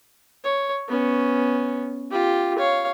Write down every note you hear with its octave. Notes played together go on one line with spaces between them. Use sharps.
C#5
B3 C#4
F4 G4
C#5 F5